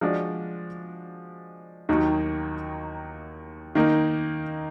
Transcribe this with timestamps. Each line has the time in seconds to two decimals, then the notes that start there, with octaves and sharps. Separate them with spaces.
0.01 F3 G#3 D4 F#4 D5
1.89 D#2 D#3 F#3 A#3 D#4
3.75 D#3 A#3 D#4